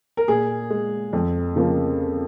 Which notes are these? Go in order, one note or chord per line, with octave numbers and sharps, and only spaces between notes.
A#4
A#2 G#4
G#3
F2
C#3 F3 A#3